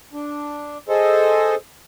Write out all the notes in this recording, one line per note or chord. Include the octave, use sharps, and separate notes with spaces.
D4
G#4 A4 C5 D#5